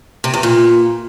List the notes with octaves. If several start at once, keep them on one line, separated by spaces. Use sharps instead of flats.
C3
E2
A#2